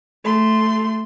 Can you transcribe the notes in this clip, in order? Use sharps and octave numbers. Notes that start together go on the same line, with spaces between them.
A3 C6